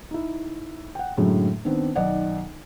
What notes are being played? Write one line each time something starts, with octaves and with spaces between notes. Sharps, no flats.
D#4 E4
F#5 G5
F#2 A2 D3 F#3 G#3
D#3 B3 C4 D4
B1 D#3 D5 D#5 F#5